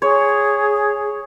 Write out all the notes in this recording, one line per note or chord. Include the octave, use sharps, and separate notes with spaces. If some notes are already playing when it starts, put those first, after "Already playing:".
G#4 C#5